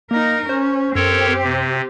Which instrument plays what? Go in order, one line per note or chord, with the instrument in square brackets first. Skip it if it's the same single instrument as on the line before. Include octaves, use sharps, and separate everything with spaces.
[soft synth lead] A#3 [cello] D#4 A#4
[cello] C#4 [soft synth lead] C5
[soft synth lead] F#2 [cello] C4 G4 [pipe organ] A4 A#4 C#5
[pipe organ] C3